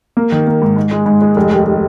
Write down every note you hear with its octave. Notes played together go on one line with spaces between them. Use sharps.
A#3
D#3
A#3
G#2
G#2
G#3
G#2
G#3
F1
D#2